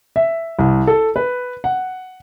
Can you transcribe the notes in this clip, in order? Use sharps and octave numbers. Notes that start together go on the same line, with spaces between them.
E5
C2
A4
B4
F#5